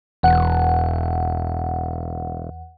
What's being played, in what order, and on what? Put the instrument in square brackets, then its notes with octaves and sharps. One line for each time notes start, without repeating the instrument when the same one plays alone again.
[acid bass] E1 [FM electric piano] E2 F#5